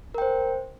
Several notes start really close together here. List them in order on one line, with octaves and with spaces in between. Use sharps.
A#4 G5 C5